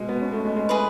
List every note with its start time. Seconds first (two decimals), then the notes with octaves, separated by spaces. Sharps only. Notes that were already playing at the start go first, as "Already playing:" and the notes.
Already playing: B2 G#3
0.09 B3
0.21 C#4
0.32 A3
0.44 G#3
0.56 G#3
0.69 E4 G#4 B4